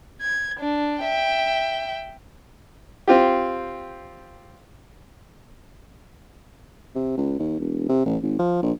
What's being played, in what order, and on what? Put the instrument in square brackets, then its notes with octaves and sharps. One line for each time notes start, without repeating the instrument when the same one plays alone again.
[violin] G#6
D4
E5 G5
[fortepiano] C4 F4 G4
[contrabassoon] C3
C#2
D#2
E1
C3
A1
G#1
F3
A#1